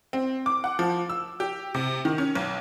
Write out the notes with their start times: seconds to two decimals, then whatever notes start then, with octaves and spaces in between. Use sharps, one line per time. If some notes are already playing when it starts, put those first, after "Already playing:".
0.13 C4
0.46 D6
0.64 F#5
0.79 F3
1.10 E6
1.40 G4
1.75 C3
2.05 D#3
2.18 C#4
2.35 B1